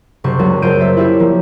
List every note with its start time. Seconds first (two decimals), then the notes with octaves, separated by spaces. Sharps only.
0.24 F#1 C3 C5 C#6
0.39 C#2 F#3 G3 A#3
0.62 F#1 F4 C5 G6 D7 D#7
0.79 C5 D5 E5
0.97 E4 F4 G4 C#5 D5 E5
1.20 F3 A#3